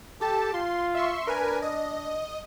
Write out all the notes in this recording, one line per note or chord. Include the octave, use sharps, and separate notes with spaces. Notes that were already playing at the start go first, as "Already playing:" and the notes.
G4 A4 A5
F4 C6
E5 C6 C#6
D4 A#4 B4 G#5
D#5